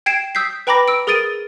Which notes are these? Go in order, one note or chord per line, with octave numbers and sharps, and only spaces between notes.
G5 G#6 C7 D7 E7
D#6 E6 G6 B6 C7
B4 G5 A#5 B5 D6 A#6
E6 D7
G#4 A#4 D#6 A6 D7 D#7